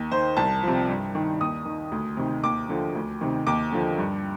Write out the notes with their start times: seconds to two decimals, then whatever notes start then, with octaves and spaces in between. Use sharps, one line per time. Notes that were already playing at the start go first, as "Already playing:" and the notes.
Already playing: D#2
0.12 D#3 C5
0.37 C2 A5
0.63 C3 F3
0.89 G2
1.15 D#3
1.40 D#2 D#6
1.65 D#3
1.92 D2
2.17 C3 D#3
2.43 D#2 D6
2.69 D3 F3
2.95 D2
3.21 C3 D#3
3.47 D#2 D6
3.72 D3 F3
3.98 G2